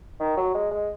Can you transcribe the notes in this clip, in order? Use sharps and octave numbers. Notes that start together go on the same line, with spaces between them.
D#3
F#3
G#3
G#3